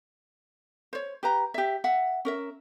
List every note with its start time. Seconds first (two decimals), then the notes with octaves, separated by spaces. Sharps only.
0.93 C5 C#5
1.23 G4 B4 A#5
1.54 G4 E5
1.84 E5 F#5
2.25 C#4 A#4 E5